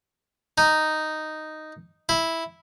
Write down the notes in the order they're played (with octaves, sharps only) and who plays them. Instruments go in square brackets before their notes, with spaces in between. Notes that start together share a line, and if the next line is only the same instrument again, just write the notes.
[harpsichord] D#4
E4